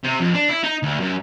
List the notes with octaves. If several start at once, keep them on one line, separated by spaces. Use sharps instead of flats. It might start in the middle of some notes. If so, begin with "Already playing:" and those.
C3
F2
D4
E4
D#4
D2
F#2